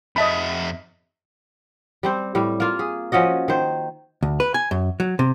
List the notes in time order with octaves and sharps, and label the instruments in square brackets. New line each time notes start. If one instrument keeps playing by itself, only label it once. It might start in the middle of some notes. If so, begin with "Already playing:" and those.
[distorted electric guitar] F2 E5 [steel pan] D#5 A5 B5
[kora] G3 C4 C5
A2 G3
A#3 F4
G#4
F3 C#4 F#4 D#5
D#3 C5
[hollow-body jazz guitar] D2
B4
G#5
F#2
F#3
C3